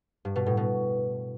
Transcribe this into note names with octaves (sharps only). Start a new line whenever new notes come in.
G2
B2
A2
B2